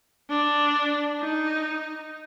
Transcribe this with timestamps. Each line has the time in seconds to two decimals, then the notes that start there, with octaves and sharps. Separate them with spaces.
0.29 D4
1.20 D#4